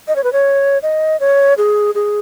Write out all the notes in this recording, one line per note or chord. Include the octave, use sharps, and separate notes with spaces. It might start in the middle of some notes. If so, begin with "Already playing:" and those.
D#5
C#5
B4
C#5
D#5
C#5
G#4
G#4